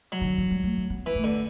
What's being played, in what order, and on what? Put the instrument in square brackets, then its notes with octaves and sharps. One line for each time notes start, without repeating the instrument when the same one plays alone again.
[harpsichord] F#3
[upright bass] D3
E3
G3
A3
A3
B3
[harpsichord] E3
[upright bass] A3
[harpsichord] D3